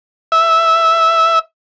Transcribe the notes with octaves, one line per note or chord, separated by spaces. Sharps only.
E5